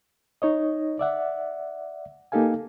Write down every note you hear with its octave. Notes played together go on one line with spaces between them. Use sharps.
D#4 C#5 D#5
D5 E5 F#5
A#3 D#4 G4 A4 F5 G#5